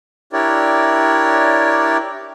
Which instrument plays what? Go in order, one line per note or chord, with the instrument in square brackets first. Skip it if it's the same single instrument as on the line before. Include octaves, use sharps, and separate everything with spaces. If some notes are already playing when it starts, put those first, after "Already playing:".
[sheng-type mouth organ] D4 E4 G4 A#4 C#5 D5